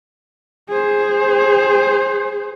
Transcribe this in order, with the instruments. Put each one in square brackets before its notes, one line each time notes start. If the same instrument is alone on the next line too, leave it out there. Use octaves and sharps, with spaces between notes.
[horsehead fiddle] G#4 C5